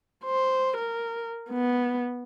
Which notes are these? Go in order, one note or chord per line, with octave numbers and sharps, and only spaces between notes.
C5
A#4
B3